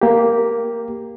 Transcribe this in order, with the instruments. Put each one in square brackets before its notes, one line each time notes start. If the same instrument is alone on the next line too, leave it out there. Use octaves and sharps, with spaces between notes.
[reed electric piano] A#3 G4